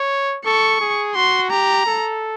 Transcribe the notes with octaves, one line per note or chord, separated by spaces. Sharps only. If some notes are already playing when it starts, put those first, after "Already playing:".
Already playing: C#5
A4 C#6
G#4
F#4 C6
G4 A#5
A4